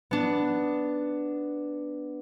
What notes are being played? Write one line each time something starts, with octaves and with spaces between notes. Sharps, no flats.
B3 D4